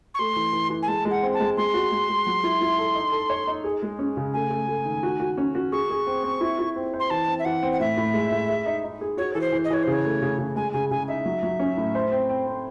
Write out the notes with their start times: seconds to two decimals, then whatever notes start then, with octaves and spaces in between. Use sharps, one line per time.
0.14 C#6
0.19 A3 C6
0.36 E3
0.53 E3
0.70 E3
0.82 G#5
0.88 G#3 A5
1.05 G#3
1.11 F#5
1.23 C4
1.34 A5
1.40 G#3
1.57 G#3 C6
1.74 F#4
1.91 G#3
2.09 G#3
2.27 F#3
2.44 E4
2.61 E4
2.78 A4
2.95 D#4
3.12 A4
3.30 C#5
3.47 D#4
3.64 G#4
3.82 G#3
3.99 C#4
4.17 C#3
4.34 A3 G#5
4.50 A3
4.68 A3
4.85 D#3
5.03 F#4
5.20 F#4
5.38 C#4
5.55 F#4
5.72 G#4 C#6
5.90 G#4
6.07 C4
6.24 C4
6.41 E4
6.59 E4
6.76 C4
6.94 C5
7.00 C6
7.10 E3 A5
7.28 C4
7.39 E5
7.45 E3 F#5
7.63 C4
7.72 F#5
7.80 A2 E5
7.97 A2
8.14 G#3
8.31 A2
8.49 G#4
8.66 D#4
8.83 D#4
9.01 G#4
9.17 F#4 C#5
9.34 E3 A4
9.41 C5
9.52 E3
9.64 D#5
9.70 E3 C#5
9.83 C#3 C5
9.93 C#5
10.04 A3
10.22 C#3
10.38 C#3
10.56 G#3 G#5
10.73 C#3 G#5
10.91 C#3 G#5
11.08 D#4 E5
11.26 F#3
11.43 F#3
11.59 C#4
11.77 A2
11.95 C5
12.12 C4
12.29 C4
12.47 C4